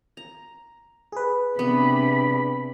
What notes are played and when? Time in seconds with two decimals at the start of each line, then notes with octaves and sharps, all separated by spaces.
0.17 A#5
1.12 G#4 B4
1.59 C3 B3 D4 B5